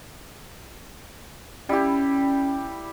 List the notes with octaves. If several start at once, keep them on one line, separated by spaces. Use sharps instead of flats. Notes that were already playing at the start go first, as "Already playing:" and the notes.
G3 C#4 E4 G4